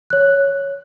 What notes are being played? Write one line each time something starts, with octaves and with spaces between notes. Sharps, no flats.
C#5 F#6